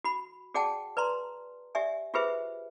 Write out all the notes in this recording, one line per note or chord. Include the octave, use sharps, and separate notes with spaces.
F#4 B5
F#4 G#4 D5 F#5 G5 A5
B4 D5 A#5 C6
G4 D5 E5 G#5
F4 G4 G#4 B4 C5 E5